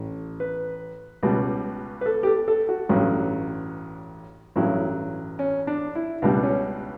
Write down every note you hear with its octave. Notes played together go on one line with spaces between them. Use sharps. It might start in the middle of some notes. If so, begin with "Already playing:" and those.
Already playing: A1
B4
C#2 B2 G3
B4
A4
G4
A4
A4
F#4
A1 G2 F#3
A1 G2 F#3 E4
C#4
D4
E4
C#2 B2 G3 D4
C#4